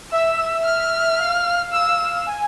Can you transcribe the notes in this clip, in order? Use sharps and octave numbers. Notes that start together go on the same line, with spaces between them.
E5 E6
F6
F5
E6
G#5